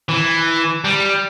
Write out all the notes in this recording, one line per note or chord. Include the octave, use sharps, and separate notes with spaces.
E3
G3